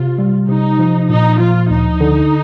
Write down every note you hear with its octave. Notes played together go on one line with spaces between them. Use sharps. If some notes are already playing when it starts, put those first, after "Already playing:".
Already playing: C3 F4
G3
C3 D#4
F3
A#2 D#4
F3 F4
D2 D#4
D3